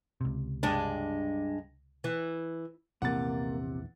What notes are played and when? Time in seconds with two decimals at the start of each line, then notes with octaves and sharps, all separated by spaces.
0.21 C#2 C3
0.63 G2 G#3 D4
2.04 E3
3.02 A#1 E2 C3 E3 A#3 F#5 A6